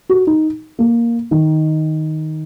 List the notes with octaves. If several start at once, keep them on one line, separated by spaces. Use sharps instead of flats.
F#4
D#4
A#3
D#3